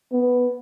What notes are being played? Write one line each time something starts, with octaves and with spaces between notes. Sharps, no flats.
B3